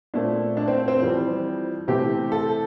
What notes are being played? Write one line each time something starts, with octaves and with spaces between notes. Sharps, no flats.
A#2 A3 C4 D4
D4
C4
C4
F2 E3 G3 C4
C3 E3 A3 C4 G4
A4